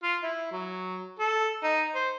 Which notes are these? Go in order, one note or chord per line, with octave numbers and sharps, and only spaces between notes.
F4
E4
F#3
A4
D#4
C5